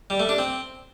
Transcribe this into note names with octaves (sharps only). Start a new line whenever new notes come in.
G3
A3
D4
C4